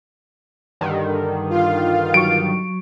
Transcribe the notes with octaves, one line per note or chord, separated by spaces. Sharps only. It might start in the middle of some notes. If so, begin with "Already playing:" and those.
G2 D3 D#3
F4 F5
F#3 C#6 D7